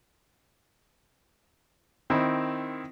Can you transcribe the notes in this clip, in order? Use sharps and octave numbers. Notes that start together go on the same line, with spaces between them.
D#3 C4 E4